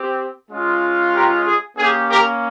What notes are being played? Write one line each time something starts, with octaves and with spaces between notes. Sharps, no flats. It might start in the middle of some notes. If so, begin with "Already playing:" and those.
Already playing: C4 G4
G#3 C#4 F4
G4 A#4
G#4
A#3 C#4 G4 G#4
G4 A#4